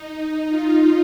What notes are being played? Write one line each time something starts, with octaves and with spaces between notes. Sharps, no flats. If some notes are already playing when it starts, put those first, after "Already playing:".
Already playing: D#4
F4